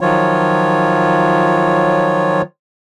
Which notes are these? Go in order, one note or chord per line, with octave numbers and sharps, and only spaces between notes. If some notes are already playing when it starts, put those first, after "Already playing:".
D#3 F3 F#3 F4 C#5